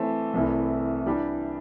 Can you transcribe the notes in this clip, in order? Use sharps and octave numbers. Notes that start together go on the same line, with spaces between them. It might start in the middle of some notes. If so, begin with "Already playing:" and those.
Already playing: E3 A3 C4
C2 C3 E3 A3
E3 G3 D4 G4